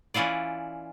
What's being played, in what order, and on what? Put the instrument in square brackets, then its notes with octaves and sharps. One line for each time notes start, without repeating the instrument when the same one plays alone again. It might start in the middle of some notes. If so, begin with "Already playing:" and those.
[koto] E3 C#4 E4 F4 D5